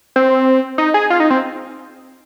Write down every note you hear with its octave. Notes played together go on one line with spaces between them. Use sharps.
C4
D#4
G#4
F4
D#4
C4